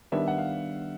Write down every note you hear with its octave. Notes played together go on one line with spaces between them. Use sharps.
D#3 G3 B3 D4 E5
F#5
F5